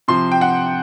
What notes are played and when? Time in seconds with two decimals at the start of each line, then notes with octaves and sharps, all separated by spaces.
0.08 C3 F3 C6
0.31 G5
0.41 F#5